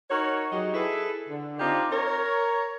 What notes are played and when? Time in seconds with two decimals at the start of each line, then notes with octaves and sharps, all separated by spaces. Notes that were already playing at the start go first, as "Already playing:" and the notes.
0.10 D#4 F#4 A#4 C#5
0.52 F#3 D#4 G4 G#4 D#5
0.74 E4 G#4 A4 B4
1.29 D3
1.59 C4 D4 D#4 F4 G4
1.92 A#4 C#5